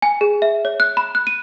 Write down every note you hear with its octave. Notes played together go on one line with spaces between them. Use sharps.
G#5
G#4
E5
C#5
F#6
B5
F#6
D#7